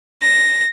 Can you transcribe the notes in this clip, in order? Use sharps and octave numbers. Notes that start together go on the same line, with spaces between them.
A#6